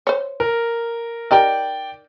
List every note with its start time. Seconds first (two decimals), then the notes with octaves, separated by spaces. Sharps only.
0.07 C5 C#5
0.40 A#4
1.31 D#4 G4 A#4 D5 G5